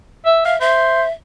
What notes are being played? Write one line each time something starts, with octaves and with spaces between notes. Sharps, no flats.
E5
E5 F5
C5 E5